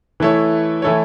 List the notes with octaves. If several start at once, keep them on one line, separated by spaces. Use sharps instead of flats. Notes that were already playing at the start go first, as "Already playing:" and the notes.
E3 A3 E4 A4 C#5
E3 A3 E4 A4 C#5